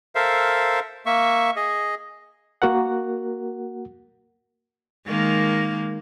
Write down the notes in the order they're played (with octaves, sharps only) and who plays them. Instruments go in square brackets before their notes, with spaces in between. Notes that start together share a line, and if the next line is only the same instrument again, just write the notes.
[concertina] A4 A#4 C5 E5 F5
A#3 E5 C#6
G#4 D#5
[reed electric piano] A#3 F#4 A#4 F#5
[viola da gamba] D#3 G#3 A#3